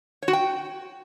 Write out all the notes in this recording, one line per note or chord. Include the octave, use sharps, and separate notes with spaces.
C#5
F#4
G5